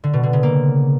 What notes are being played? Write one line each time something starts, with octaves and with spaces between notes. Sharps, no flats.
D3
B2
D3
C#3
A#3